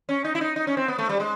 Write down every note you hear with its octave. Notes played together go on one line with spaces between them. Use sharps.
C#4
D#4
E4
D#4
D#4
C#4
C4
B3
A3
G3
G#3